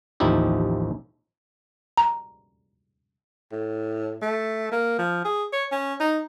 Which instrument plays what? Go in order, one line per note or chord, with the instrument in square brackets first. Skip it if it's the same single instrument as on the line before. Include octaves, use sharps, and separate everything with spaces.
[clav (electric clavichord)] A1 D#2 F3 D#4 E4 G4
[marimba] A#5
[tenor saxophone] A2
A3
A#3
F3
G#4
C#5
C#4
D#4